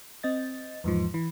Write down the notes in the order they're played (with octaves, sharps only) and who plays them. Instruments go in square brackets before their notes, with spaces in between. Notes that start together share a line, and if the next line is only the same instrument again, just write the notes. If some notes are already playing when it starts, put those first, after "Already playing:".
[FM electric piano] C4 D#5 A6
E2 G#2 F3
E3